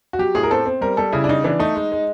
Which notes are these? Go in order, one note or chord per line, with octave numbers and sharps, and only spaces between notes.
F#4
F#3 G4
A2 G#4
A#4
C4 A4
C4
G3 A#4
G3 A4
C#3 E4
D4
C#3 D#4
E3 D4
A3 D#4
G#3
G#3